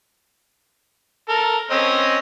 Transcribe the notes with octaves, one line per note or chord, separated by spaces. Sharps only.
A4 A#4
C4 C#4 D#5